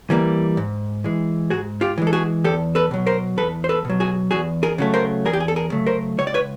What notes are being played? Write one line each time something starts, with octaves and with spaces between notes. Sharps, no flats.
E3 G3 A#3
G#2
E3 G#3
G#2 F#4 G#4
F4 G4
E3 G#3
A4
F#4 G#4
E2 G4 A4
A4 B4
B2 F#3
A#4 C5
E2 A4 B4
C5
A4 B4
B2 F#3
F#4 G#4
E2 F#4 G#4
G#4 A#4
C#3 F#3 A3
A#4 C5
E2 G#4 A#4
G4
G#4
A4
G#4 A#4
C#3 F#3 A3
A#4 C5
C#2 C#5
D5
B4 C#5